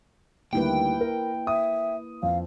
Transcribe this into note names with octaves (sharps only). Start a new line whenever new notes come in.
D2 D#3 G3 A#3 E4 B4 G5
A#4
E5 D#6
F2 F5